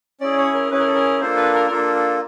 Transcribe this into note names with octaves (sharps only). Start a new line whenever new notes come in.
C#4 E4 G#4 D5
C#5
A#4
C#4 E4 G#4 B4
A#4
A4
A#4
A#3 D4 F4 A4 C5
B4
A#4
A#4
A#3 D4 F4 A4
A4